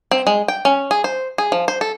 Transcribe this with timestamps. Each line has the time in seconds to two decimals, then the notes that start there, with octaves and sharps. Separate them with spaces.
0.11 C4
0.27 G#3
0.48 G5
0.65 C#4
0.91 G#4
1.04 C5
1.38 G#4
1.52 F3
1.68 C5
1.81 A4